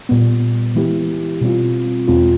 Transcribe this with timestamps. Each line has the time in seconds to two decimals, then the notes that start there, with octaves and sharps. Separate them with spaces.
0.09 A#2 G3 B3
0.75 E3 G#3 B3 E4 G4
1.41 B2 G3 C4 F4
2.08 E2 B2 G#3 C4 F4